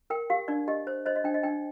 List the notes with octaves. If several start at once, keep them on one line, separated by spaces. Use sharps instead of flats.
A#4 G5
G4 F5
D4 D5
G4 D#5
C5
C5 D#5
D#5
D4 G5
D#5
D4 G5